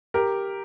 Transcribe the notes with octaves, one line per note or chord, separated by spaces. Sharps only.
G4 A#4